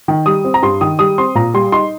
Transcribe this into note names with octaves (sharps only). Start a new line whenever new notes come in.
D#3
G3 D#6
C4
A#5
G2 C6
D#3 D#6
G3 D#6
C4 C6
A#2 A#5
G3 C6
D#4 C6